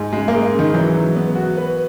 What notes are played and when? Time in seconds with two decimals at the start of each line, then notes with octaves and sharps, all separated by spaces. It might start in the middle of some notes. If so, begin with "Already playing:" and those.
Already playing: G#2
0.13 C#3 G#3
0.28 A#3
0.33 G#3
0.54 C#3
0.59 D#3
0.74 E3 F#3
0.95 F#3
1.16 B3
1.36 F#4
1.57 B4